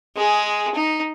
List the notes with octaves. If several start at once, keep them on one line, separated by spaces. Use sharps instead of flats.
G#3 G#4
D#4